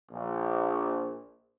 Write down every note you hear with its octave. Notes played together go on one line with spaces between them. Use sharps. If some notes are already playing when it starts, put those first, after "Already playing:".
A#1